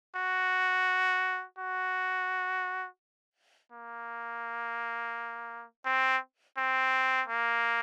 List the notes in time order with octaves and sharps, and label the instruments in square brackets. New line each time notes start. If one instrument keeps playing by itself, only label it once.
[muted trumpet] F#4
F#4
A#3
C4
C4
A#3